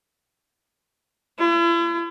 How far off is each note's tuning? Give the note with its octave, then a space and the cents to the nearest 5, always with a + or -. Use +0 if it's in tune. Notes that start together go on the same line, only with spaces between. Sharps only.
E4 +45